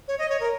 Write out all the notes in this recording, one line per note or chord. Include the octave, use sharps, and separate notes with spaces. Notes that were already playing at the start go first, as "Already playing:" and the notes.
C#5
D#5
C#5
A#4